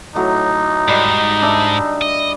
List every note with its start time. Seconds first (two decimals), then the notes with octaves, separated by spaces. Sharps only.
0.15 A2 F#3 D#4
0.88 G#2 G3 D#5
1.42 D4 E5
2.01 D#5